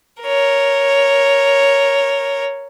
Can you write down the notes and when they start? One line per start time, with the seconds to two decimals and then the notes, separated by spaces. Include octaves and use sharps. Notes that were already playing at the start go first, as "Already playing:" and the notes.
0.23 A#4 C#5